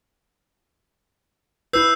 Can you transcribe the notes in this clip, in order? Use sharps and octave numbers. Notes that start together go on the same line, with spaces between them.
E4 B4 E6 G6 C7